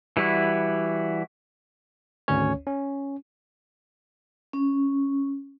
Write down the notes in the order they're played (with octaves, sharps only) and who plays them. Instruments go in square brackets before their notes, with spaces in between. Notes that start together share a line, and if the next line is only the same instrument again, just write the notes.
[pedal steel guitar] E3 G3 E4 F#4
[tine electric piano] G#1 D2 C#4 C#5
C#4
[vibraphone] C#4